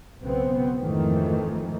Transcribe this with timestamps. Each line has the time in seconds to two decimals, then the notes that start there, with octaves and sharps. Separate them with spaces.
0.22 B1 C#3 B3 C4
0.78 F2 G#2 D#3 E3 A3